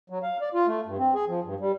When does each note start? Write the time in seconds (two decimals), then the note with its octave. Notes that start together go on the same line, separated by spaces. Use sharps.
0.10 F#3
0.23 F5
0.41 D5
0.54 F4
0.67 A3
0.86 G2
0.99 C4
1.14 G#4
1.28 F3
1.44 G2
1.60 G3